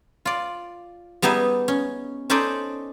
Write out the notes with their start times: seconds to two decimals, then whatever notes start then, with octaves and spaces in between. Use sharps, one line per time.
0.25 F4 D5
1.22 G3 B3 D#4 G#4 E5
1.68 C#4
2.30 C#4 D#4 A4 C5 D5 D#5